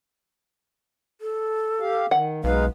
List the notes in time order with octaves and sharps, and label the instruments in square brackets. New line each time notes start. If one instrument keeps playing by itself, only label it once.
[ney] A4
[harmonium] G4 F5
[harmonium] D#3 [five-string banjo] F#5
[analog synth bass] B1 [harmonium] G#3 D#4 F5 [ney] B4